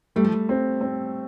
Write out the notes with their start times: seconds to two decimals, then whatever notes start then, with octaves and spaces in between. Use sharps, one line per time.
0.16 G3 A3
0.25 F3
0.32 G3
0.49 C4
0.81 C4